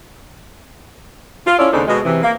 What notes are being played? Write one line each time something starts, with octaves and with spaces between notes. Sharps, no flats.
F4
C#4 E4 F4 A4 C#5 D5
D#2 C#3 C4 D4 D#4 A4
B2 G#3
C3 E3
A#3